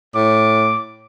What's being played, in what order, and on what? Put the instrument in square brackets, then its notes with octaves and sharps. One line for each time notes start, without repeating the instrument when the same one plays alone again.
[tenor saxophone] A2 [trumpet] D6